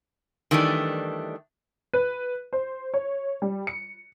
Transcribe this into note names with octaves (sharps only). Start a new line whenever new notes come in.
D#3 E3 G3 A3 D4
B4
C5
C#5
G3
C#7